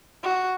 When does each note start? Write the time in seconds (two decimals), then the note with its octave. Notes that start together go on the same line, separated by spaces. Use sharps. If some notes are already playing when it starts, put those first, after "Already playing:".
0.23 F#4